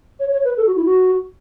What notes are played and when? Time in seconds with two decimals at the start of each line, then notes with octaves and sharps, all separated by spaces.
0.20 C#5
0.32 C#5
0.45 B4
0.57 A4
0.67 F#4
0.76 E4
0.85 F#4